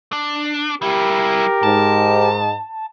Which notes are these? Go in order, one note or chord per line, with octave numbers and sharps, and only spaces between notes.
D4
G3 E4 G4 A#4
G#2 A5